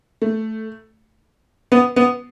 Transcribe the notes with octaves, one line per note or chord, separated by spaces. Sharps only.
A3
B3
B3